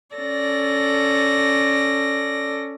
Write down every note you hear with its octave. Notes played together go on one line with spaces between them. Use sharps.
C#4 A4 D5 A#6